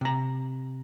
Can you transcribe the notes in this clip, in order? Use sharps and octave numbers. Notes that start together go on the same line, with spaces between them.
C3 A#5